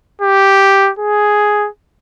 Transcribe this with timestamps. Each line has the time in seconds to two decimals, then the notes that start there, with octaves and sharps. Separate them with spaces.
0.22 G4
0.99 G#4